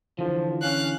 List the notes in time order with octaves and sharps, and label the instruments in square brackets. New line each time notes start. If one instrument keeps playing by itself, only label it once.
[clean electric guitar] D3 E3 [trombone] F3
[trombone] C#4 [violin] F5 F#6